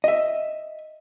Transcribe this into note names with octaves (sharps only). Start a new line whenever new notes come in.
D#5 E5